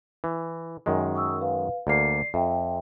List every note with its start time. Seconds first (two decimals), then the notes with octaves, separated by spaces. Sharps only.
0.24 E3
0.86 F#2 D#3 G#3
1.15 C#6 D#6 E6
1.41 B4 F5
1.87 D2 A#3 D5 C7
2.34 F2 E5 G5